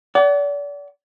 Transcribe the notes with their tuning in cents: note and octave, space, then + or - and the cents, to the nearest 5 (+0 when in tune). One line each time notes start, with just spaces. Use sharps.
D5 -35 F#5 +35